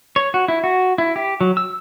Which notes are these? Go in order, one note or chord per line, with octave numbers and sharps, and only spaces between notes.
C#5
F#4
E4
F#4
E4
G4
F#3
E6